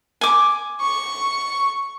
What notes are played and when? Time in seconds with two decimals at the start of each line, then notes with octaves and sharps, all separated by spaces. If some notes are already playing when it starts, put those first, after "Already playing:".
0.21 G#5 D6
0.80 C#6